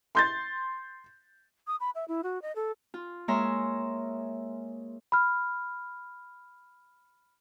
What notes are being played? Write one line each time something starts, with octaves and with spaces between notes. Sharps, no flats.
C6 G6 A6
D#6
B5
E5
E4
F#4
D#5
A4
F4
G#3 A#3 C#5 E5 A#5 C6
B5 F6